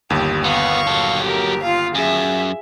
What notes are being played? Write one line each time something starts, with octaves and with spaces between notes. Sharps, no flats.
G1 D#2 G4
B3 F5 C#6
F#3 A4
G4 A#4
F4 F5
F#2 G#4 E5